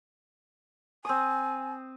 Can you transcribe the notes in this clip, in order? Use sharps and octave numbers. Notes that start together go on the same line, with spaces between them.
C4 G#5 D#6